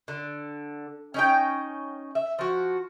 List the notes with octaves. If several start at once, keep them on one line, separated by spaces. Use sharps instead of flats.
D3
C#4 D#4 G5
E5
F3 F#4